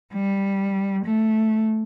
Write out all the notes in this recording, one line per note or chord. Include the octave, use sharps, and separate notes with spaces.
G3
A3